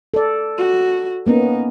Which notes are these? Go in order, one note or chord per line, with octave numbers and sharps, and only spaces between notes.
A4 D5
F#4
A#3 B3 C#4 D#4